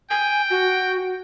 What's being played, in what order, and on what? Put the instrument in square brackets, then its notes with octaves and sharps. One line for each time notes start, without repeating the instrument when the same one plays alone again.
[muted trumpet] G5 [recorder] G#5
[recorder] F#4